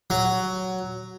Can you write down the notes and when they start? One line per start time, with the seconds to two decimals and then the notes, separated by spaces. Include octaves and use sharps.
0.10 F#3